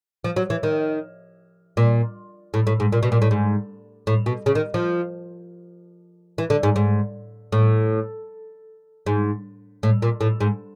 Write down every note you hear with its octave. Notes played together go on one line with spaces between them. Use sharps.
F3
F#3
E3
D#3
A#2
A2
A2
G#2
A#2
B2
A#2
A2
G#2
A2
B2
C#3
D#3
F3
E3
D3
G#2
G#2
A2
G#2
A2
A#2
A2
G#2